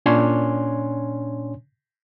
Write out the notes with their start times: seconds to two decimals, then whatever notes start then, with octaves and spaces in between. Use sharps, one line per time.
0.06 A#2 C#4 D4 C#5 G#5 C6